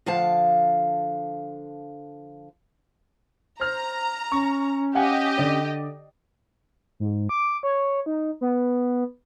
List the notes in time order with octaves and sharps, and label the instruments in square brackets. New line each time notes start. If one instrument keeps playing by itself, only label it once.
[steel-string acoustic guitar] D3 F3 F5 A5
[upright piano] C5 F6 [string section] A#5
[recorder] C#4 [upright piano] C#6
[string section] G4 D#5 [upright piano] F5 F#5 G#5
[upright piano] D3 D5
[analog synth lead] G#2
D6
C#5
D#4
B3